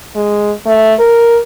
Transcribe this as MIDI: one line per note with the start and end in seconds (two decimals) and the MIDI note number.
0.15 0.51 56
0.66 0.94 57
0.99 1.38 70